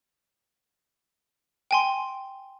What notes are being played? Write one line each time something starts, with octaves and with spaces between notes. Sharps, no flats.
G5 G#5 C6